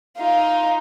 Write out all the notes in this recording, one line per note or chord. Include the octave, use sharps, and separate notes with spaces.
D#4 F4